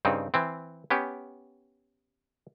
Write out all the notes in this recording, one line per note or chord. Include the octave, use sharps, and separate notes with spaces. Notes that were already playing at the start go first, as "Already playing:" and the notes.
G2 C#3 C4 D#4
E3 C4
B3 C#4 G4